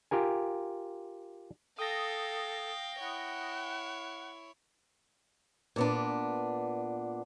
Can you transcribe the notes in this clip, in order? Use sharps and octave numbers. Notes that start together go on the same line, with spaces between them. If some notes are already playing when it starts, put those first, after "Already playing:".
F4 G4 A#4 G#5
A4 F5 G5 D#6 A#6
E4 C#5 F#5
A#2 B3 D4